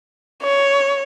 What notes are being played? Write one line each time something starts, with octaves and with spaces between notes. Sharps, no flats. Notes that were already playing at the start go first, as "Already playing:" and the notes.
C#5